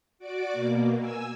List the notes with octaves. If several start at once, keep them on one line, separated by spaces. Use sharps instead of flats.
F#4 D5 D6
B2 A#3
G#5 E6